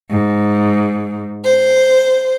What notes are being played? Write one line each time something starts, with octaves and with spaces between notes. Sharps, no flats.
G#2
C5